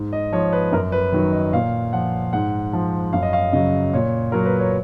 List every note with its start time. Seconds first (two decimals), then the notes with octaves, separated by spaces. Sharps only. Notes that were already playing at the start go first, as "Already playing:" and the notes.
Already playing: G#2
0.13 D#5
0.32 F3 C#5
0.53 B4
0.72 F#2 A#4
0.92 B4
1.13 D#3 F#3
1.32 D#5
1.53 A#2 F5
1.93 F3 F#5
2.33 G#2 F#5
2.73 F3
3.13 F#2 F5
3.23 D#5
3.33 F5
3.53 C#3 F#3 D#5
3.93 A#2 C#5
4.32 F#3 A#4
4.46 B4
4.60 C#5